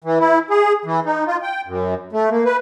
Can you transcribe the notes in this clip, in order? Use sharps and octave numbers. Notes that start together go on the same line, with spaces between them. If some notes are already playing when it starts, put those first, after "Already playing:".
E3
E4
G#4
E3
D#4
F4
G5
F#2
A3
A#3
B4